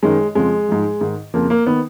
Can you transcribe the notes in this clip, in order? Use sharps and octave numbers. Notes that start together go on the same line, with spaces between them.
F#2 D#3 G#3
F2 C#3 F3 G#3
G#2 F3
G#2 D#3
F2 C#3 F3 A#3
A#3
D#3 B3